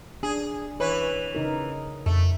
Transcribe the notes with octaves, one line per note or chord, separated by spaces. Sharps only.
D4 G#4
E3 B4 C#5
C#3 D#4 A#4
F2 A3